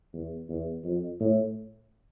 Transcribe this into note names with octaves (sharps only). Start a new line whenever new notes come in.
E2
E2
F2
A2